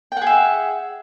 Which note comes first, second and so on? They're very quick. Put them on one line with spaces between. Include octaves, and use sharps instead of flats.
G5 F#5 G#4 E5